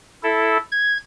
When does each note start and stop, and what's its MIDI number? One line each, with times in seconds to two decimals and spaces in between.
0.23 0.57 64
0.23 0.57 69
0.72 0.98 92